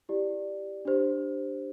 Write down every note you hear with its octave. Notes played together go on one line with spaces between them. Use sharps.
E4 G4 D5
D4 G4 C5